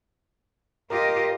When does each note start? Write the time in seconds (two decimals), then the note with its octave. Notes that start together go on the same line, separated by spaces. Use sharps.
0.90 F4 G4 A#4 D#5